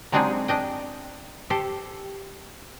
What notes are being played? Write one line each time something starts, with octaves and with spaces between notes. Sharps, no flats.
F#3 G#3 C4 D4 D#4 G#4
D4 D#5 G5
G4 A4 C5